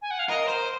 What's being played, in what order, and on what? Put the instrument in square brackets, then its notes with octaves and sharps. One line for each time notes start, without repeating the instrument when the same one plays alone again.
[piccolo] G#5
F#5
F5
[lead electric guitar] A#4 [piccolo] D#5
[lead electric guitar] C5